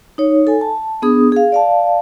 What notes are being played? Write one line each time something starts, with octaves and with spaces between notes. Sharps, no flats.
D#4 C#5
A4 G#5
A5
B3 D4 G#4 D#6
G#4 F5
D5 F5 A5